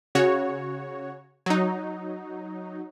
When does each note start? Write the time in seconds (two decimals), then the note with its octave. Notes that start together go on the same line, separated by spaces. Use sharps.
0.15 C#3 F#4 C#5
1.46 F#3 D#4